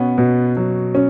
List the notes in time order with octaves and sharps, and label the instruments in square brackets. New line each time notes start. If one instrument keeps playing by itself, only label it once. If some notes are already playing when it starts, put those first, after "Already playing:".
Already playing: [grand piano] B2 C#4 [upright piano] B3
[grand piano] B2
F#3
[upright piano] C#4